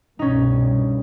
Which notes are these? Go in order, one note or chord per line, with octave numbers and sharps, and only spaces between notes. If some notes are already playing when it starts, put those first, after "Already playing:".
C2 G2 B2 C#4 D#4